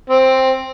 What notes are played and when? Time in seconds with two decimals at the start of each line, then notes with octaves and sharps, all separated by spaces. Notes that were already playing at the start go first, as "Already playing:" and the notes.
0.10 C4